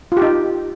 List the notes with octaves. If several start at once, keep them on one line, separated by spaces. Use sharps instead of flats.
D#4 F4 G4